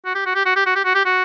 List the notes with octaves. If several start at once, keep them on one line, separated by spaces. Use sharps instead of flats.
F#4
G4
F#4
G4
F#4
G4
F#4
G4
F#4
G4
F#4